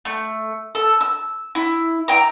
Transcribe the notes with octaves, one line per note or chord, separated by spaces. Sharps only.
A3
A4
E6
E4
E5 G5 A#5